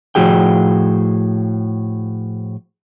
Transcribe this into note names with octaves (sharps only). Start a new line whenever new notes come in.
A2 F3 F#4 G#4 G5